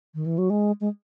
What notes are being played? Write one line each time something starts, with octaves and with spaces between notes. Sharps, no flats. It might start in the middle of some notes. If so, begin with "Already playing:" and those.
D#3
E3
F#3
G#3
G#3